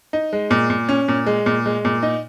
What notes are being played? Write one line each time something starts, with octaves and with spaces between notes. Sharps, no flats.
D#4
G#3
A#2
A#2
C#4
A#2
G#3
A#2
G#3
A#2
D#4